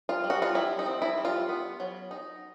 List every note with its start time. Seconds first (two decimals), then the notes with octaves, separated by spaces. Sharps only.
0.09 F4
0.24 G3
0.30 F#4
0.42 F4
0.55 G3 E4
0.79 D#4
0.86 C4
1.02 E4
1.18 G3
1.25 F4
1.49 B3
1.80 F#3
2.11 D#4